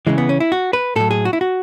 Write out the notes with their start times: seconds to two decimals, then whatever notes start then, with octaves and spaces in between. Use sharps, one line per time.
0.07 C#3 E3 G#3
0.18 B3
0.29 C#4
0.40 E4
0.52 F#4
0.73 B4
0.96 A2 F#3 A4
1.11 G#4
1.25 F#4
1.33 E4
1.41 F#4